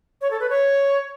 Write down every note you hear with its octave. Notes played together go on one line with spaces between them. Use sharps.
C#5
A4
B4
C#5